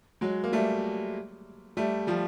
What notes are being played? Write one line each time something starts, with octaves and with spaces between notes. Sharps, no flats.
F#3 G#3
A#3
G3 A3
G3 A3
F3 G3